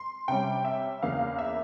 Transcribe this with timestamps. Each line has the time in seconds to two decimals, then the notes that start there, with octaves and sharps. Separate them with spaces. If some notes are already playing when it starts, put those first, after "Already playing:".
Already playing: C6
0.28 C3 G3 C#4 G5
0.65 E5
1.03 E2 C#3 E3 A#3 F5
1.39 E5